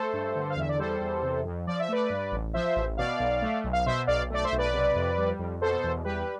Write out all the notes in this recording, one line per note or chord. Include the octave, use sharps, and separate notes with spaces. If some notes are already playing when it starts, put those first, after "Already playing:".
Already playing: A3 A4 C5
G2
D3
F5
E2 E5
D5
G3 A4 C5
E2
C3
F2
F3 D5
E5
A3 B4 D5
G2
A1
F3 C5 E5
A1
B2 D5 F5
B1
A3
B1
F5
B2 C5 E5
B1 D5 F5
A3 D5
C5 E5
B1
B4 D5
C3
F2
G3
F2
B2 A4 C5
E2
G3 G4 B4